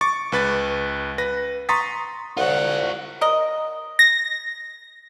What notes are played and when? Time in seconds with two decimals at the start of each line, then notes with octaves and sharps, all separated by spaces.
0.01 C#6 D6 A6
0.32 C#2 B4 A6
1.18 B4 A#6
1.69 A#5 C6 C#6 D#6 A6 B6
2.37 C2 F4 C#5 F#5
3.21 A#4 D#5
3.99 A#6